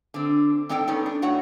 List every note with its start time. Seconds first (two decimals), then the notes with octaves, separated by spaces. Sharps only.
0.14 D3 C4
0.69 G#2 C4 D4 A4 G5
0.87 B3 C#4 D#4 A4
1.06 D4
1.22 A2 F#4 C#5 F#5